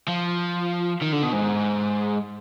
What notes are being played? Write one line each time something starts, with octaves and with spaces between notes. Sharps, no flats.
F3
D#3
D3
B2
G#2